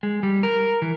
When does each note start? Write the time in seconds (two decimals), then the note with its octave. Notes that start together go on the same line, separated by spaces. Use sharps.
0.03 G#3
0.23 G3
0.43 A#4
0.82 E3